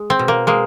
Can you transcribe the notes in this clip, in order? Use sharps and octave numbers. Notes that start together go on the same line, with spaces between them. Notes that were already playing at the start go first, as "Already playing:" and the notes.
Already playing: G#3
C4
B2
A#3
G#3 A#3